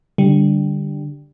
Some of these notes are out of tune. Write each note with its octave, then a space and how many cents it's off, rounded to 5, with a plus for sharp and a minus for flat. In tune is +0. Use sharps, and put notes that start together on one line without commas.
D3 +0 G3 +0